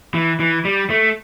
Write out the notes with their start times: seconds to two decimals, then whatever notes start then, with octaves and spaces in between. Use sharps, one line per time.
0.14 E3
0.40 E3
0.65 G3
0.90 A3